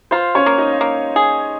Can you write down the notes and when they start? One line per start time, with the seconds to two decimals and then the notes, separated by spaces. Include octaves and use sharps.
0.11 F4 C5 C6
0.35 C#4 C#5
0.46 A#3
0.58 D#4 D#5
0.81 A#3
1.16 G#4